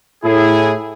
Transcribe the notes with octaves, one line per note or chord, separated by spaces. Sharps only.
A2 E4 G#4